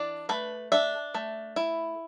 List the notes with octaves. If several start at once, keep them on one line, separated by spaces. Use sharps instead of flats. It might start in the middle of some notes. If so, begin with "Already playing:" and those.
Already playing: E3 D4 D5
A3 B4
D4 E5
A3
E4